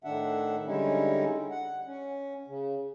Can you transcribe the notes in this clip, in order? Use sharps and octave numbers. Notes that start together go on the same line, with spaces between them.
A2 D#3 D4 E5 F#5
D3 G3 G#3 C#4 D#4 E4
F#5
C#4
C#3